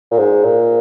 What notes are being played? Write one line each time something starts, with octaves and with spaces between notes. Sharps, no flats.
A#2
G#2
A#2